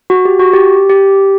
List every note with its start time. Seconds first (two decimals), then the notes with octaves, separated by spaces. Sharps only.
0.10 F#4
0.25 G4
0.39 F#4
0.53 G4
0.89 G4